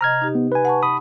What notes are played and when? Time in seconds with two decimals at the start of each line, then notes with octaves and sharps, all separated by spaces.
0.01 C3 D#5 A#5 F6 G#6
0.22 D#4 G4
0.35 B3
0.52 B4 G#5
0.65 F#5 A5 C#6
0.83 B5 D#6